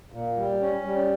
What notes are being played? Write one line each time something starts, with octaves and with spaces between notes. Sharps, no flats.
A#2
G3
C#4
G3